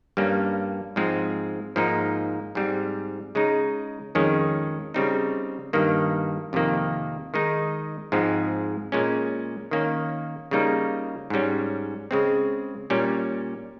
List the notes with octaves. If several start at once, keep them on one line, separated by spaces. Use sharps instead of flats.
G2 G3 A#3 C#4
G#2 F3 G#3 C4
G#2 F3 A#3 D#4
G#2 G3 C4
C#3 G#3 D#4
F2 D#3 G#3 C#4
C#3 G3 C4 D#4
G2 D#3 A#3
F2 C3 D#3 A#3
D#3 G#3 D#4
G#2 F3 G#3 C4
A#2 G#3 C#4
D#3 A#3 C#4
C#3 G3 A#3 D#4
G#2 G3 C#4
C#3 G#3 C4
A#2 G3 C#4